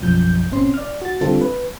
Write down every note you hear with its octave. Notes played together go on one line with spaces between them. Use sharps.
B1 F#2 F3 G6
G1 A#2 C4 C#4 C6
D5 F6
F#4 A6
D3 G3 C4 F4 A4
B4